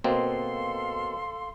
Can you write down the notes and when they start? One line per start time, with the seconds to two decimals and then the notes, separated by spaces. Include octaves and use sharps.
0.04 B2 A#3 C4 A4 F5 C6